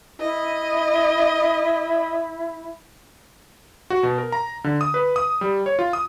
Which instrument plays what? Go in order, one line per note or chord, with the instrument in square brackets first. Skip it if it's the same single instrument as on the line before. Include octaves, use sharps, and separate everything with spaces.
[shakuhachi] E4 [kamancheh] D#5
[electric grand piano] F#4
B2
A#4
A#5
D3
D#6
B4
D#6
G3
C#5
F4
D#6